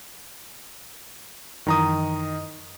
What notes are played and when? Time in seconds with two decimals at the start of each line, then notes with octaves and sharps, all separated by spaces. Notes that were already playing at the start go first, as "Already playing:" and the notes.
1.67 F#2 D#3 E3 D#5 A#5 D#6